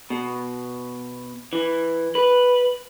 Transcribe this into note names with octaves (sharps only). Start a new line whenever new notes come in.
B2
E3
B4